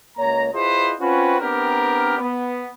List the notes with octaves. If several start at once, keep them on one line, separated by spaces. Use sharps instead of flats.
C#2 A#3 C#5 A#5
E4 F4 G#4 B4 C5 D#5
C4 C#4 F4 F#4 B4
B3 C4 D4 G4 A#4
B3